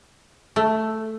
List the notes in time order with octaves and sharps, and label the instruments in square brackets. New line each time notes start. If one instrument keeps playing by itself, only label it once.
[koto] A3